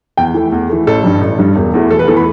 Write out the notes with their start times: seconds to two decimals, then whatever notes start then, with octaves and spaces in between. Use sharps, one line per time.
0.17 E2 G5
0.34 E3 A3
0.52 E2
0.70 E3 A3
0.87 A1 A4
1.04 G2 G3
1.21 A1
1.38 G2 G3
1.56 E1
1.74 E2 E3 A3
1.90 E1 A4
1.99 B4
2.07 E2 E3 A3 A4
2.17 B5